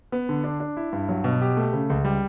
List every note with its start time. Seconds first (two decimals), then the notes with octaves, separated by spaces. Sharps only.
0.12 B3
0.29 D3
0.44 D4
0.60 D4
0.77 E4
0.93 G2
1.09 F#3
1.24 B2
1.41 G4
1.57 A3
1.73 C#3
1.90 C#2
2.05 G3